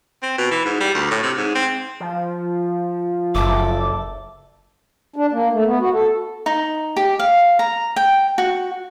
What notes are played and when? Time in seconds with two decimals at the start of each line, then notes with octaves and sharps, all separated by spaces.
0.23 C4
0.38 B2
0.51 E3
0.65 G#2
0.80 G3
0.94 D2
1.11 A2
1.23 C3
1.37 G#2
1.55 C4
2.00 F3
3.35 F#1 A3 A4 D6
5.16 D4
5.33 A#3
5.52 A3
5.66 B3
5.80 F#4
5.93 A4
6.46 D#4
6.96 G4
7.19 F5
7.59 A#5
7.96 G5
8.38 F#4